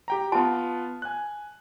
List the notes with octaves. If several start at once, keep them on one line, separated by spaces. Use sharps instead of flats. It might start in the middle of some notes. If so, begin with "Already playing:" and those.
G4 G5 A#5
B3 F4 A5
G#5 F#6